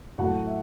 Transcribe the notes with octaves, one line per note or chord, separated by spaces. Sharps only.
A2 F#3 A3 F#4 F#5
E5